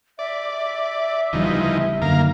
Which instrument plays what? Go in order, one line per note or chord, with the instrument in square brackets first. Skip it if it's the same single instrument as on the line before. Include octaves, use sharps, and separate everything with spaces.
[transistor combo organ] D5 [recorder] E5
[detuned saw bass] D1 [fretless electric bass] E2 C#3 G3 [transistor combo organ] E3 F3 D#4
[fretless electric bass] F#2 D#3 [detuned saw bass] D3 [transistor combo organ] A#3 F5 A#5